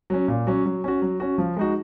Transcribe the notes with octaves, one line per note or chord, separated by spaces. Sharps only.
F#3 C#4
A#2
F#3 C#4
F#3
C#4 F#4
F#3
C#4 F#4
F3
G#3 D#4 F#4